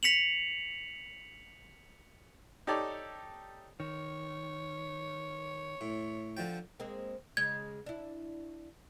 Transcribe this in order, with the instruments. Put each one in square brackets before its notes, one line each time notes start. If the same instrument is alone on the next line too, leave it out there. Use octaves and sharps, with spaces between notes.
[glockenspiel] B6 C#7 F7 F#7
[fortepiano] D#4 G4 A4 C#5 D5
[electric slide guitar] D#3 [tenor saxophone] C#5
[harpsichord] A2
D3 F3 G5
[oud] G#3 A#3 C4
[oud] C#3 G#3 [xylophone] G#6
[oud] D4 E4